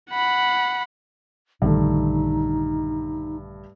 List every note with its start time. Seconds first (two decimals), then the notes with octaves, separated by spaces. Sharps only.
0.11 F#5 B5
1.62 A#1 G2 D3 D#3 A3 D#4